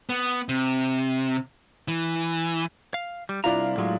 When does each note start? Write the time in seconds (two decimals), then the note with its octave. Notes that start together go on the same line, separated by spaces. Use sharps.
0.09 B3
0.49 C3
1.88 E3
2.94 F5
3.29 G3
3.44 C2 D4 E4 F4 A#5
3.77 A2 F#3 G#3